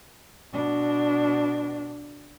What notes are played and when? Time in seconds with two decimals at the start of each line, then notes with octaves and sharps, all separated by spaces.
0.53 B2 D4